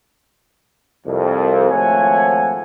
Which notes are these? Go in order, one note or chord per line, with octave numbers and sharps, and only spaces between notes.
C2 F2
G#1 F3 A3 C#5 F#5 G#5